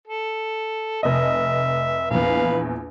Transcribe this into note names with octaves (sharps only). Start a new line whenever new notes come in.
A4
F1 D#5 E5
A#1 E2 B4 F5